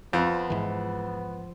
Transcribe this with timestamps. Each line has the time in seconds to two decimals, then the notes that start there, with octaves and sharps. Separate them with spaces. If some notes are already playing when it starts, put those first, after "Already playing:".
0.13 F2 F3 B3
0.50 G#2 E3